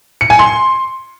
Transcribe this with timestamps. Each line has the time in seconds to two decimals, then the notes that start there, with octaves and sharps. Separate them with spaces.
0.21 C#7
0.30 G#5
0.39 C6